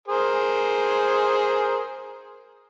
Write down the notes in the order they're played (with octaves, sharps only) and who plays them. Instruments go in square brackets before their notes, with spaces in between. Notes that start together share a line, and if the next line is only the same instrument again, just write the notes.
[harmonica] G#4 A#4 C5